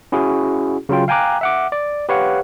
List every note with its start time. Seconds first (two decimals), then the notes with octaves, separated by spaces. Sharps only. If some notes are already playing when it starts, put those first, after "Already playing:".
0.12 C#4 E4 F#4 G#4
0.89 C#3 F#3 F4 G5
1.08 F5 G5 G#5 A#5 D6 F#6
1.41 E5 F#5 D6
1.72 D5
2.09 G4 B4 C#5 F5 F#5